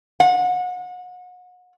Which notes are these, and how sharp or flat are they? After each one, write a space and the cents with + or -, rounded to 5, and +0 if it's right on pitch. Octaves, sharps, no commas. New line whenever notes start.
F#5 -35